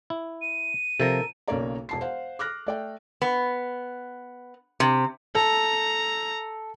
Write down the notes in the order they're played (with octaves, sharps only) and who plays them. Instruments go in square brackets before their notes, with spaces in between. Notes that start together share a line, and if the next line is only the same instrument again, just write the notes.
[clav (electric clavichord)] E4
[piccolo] D#7
[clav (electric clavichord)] C3 F3 [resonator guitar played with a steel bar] A4 A#4
[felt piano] B1 C#3 A#3 C#5 D5 A#5
E1 A5 C7
C5 F5 F#5
D6 F6 F#6 A#6
A3 D5 G5
[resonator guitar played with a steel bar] B3
C3
[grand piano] A4 [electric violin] A#5